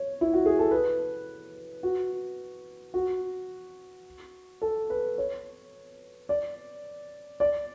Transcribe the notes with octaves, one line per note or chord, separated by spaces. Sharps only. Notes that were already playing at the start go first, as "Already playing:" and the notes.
Already playing: C#5
E4
F#4
G#4
A4
B4
F#4
F#4
A4
B4
C#5
D5
D5